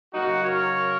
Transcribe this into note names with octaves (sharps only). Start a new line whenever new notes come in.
C#3 F#3 A#3 D#4 F#4
A#4 C#5